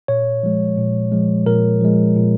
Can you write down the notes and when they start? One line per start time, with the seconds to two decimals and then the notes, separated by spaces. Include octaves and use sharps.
0.08 A#2 C#5
0.43 F3 G#3
0.77 A#2
1.12 F3 G#3
1.46 A#2 A#4
1.81 F3 G#3
2.16 A#2